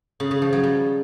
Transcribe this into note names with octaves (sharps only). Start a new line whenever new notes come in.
C#3
C#3
F3
F#3
G3